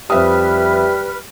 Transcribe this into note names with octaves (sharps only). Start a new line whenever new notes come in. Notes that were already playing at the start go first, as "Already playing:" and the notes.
F2 G3 B4 E5 D#6 F6